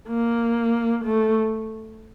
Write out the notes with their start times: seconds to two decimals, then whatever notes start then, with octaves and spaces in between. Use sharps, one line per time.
0.08 A#3
1.05 A3